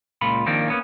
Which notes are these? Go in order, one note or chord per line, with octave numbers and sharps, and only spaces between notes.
C#2 A#2 F4 B5
D#3 F3 A#3 C4 D4
A#3 B3 C#4